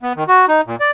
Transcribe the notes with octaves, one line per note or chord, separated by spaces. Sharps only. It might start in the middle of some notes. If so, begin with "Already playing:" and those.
B3
D#3
F#4
D#4
A#2
D5